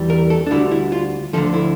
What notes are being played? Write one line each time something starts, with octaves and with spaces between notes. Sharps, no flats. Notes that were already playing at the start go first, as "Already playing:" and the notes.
Already playing: E2 E3 G3
A#4
A4
D4
D2 D3 G3 E4
E4
F4
D2 D3 F3 A4
E4